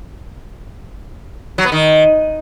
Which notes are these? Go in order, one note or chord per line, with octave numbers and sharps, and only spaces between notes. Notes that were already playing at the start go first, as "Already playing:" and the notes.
F#3
B3
D#3